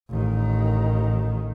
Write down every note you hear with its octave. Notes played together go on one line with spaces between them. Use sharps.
A1 D#3